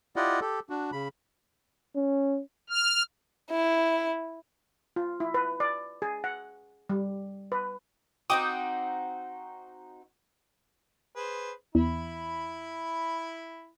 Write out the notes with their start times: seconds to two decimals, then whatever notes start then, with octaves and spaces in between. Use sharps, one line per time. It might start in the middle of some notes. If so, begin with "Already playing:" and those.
0.16 E4 F4 G4 D5 D#5 F#5
0.41 G4 A4
0.70 D4 F#4
0.92 C#3 B5
1.95 C#4
2.69 F6
3.50 E4
4.96 F4
5.20 E4
5.34 B4
5.60 D5
6.02 G#4
6.24 F#5
6.89 G3
7.52 B4
8.30 C4 D#4 F#4 G5 D6 D#6
11.16 G#4 B4 C5
11.75 E2 E4 B5